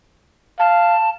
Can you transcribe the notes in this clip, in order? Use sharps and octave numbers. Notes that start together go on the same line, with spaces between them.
F5 A5